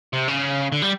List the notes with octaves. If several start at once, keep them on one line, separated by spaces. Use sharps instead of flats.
C3
C#3
D3
G3